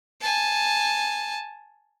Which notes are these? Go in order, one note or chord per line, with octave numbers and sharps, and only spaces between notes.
G#5 A5